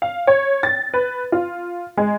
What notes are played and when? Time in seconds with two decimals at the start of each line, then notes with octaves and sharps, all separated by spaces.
0.02 F5
0.27 C#5
0.63 A6
0.94 B4
1.32 F4
1.97 G#3